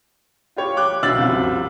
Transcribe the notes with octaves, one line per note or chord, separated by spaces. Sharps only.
F4 G4 C#5
G5 D6 F#6
B1 E5 F5 E6 A6 F#7
C2 F#2 F3